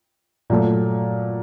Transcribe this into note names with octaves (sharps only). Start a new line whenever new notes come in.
A#2 F#3 A3